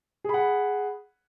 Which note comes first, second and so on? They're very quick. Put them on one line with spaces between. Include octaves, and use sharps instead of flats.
G#4 B5 F#5